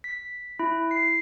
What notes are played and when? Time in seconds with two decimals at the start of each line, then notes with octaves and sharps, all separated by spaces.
0.04 B6
0.59 E4
0.91 C7